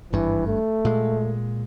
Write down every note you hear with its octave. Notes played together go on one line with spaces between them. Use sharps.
G#1 G2 E3
A3
A#2 G#3